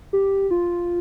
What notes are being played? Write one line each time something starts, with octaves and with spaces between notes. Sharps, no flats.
G4
F4